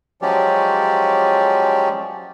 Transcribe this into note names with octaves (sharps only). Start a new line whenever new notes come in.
F3 F#3 G#3 C#4 G4 D5